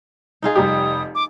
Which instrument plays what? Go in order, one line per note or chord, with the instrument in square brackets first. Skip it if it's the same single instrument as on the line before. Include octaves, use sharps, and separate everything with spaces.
[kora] D#4 F4 G#4
[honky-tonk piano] F1 G3 G4 [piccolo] D#6
[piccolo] D6